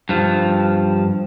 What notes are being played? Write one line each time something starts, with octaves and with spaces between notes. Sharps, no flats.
G2 F3